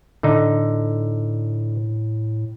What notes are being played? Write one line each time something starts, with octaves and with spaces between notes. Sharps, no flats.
A2 D3 D#4